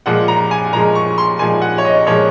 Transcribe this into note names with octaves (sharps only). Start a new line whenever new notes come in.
A#2 F3 G#3 F#5
A#5
G#5
A#2 F3 G#3 A#5
C#6
C6
A#2 F3 G#3 G#5
F#5
C#5
D#5
A#2 F3 G#3 C#5